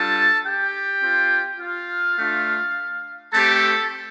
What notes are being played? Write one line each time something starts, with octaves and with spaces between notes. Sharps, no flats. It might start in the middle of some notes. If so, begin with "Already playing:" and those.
Already playing: G3 D4 F4 A4 A5
G4 G5
C4 F4
F4 F5
A3 D4 F4
A3 C4 G4 A4 A5